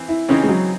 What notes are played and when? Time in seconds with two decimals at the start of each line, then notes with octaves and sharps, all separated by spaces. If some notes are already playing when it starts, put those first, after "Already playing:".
Already playing: E3 C4
0.09 E4
0.28 C#3 E3 C4 C#4 D#4
0.43 G#3
0.49 F#3